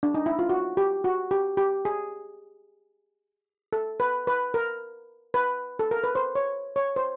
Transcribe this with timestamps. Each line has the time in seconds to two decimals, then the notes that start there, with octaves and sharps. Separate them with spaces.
0.03 D4
0.14 D#4
0.26 E4
0.39 F4
0.49 F#4
0.77 G4
1.04 F#4
1.31 G4
1.57 G4
1.85 G#4
3.73 A4
4.00 B4
4.27 B4
4.54 A#4
5.34 B4
5.79 A4
5.91 A#4
6.04 B4
6.15 C5
6.35 C#5
6.76 C#5
6.96 C5